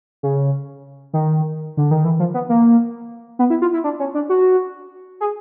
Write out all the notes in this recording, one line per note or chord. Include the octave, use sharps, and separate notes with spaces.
C#3
D#3
D3
D#3
E3
F3
B3
A#3
B3
E4
F4
E4
D4
C#4
D4
F#4
G#4